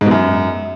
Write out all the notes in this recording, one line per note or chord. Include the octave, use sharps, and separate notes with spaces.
G#2
B2
F#2